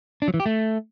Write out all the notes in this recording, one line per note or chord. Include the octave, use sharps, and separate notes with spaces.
D4
F#3
E3
G4
A3